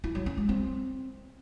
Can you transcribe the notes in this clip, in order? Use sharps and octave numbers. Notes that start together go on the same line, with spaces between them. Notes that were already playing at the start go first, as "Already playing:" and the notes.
E4
F#3
C#4
G#3
C4